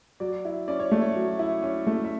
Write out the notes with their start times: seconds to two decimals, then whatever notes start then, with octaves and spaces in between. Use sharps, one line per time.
0.20 F#3 D5
0.45 E4
0.68 C#4 D5
0.80 C#5
0.92 A3
1.01 C#5
1.16 F#3
1.39 E4
1.63 C#4
1.87 A3
2.04 E5